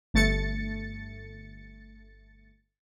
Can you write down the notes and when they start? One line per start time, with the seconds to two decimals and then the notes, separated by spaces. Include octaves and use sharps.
0.14 G1 A3 A6 C#7